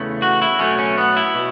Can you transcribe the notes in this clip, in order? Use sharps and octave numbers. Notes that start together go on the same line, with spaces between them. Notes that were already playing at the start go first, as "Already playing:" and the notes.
Already playing: E2 C#3 E3 A3
F#4
E4
B2 F#3 A3 C#4
C#4
B3
E4
B2